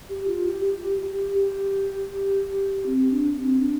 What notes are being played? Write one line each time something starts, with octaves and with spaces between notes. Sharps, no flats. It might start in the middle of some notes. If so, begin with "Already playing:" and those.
G4
F4
G4
G4
G4
G4
C4
D4
C4
D4